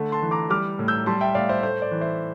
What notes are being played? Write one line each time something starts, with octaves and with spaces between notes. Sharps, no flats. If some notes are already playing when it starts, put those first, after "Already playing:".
Already playing: D3 A3
A5 C6
E3
A#5 D6
G3 D6 F6
A2
E6 G6
G3 A5 C6
E5 G5
A2 D5 F5
C5 E5
A3 C5
D5
E3
C5 E5